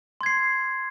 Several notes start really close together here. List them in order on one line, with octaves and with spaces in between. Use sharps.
C6 G#6 C7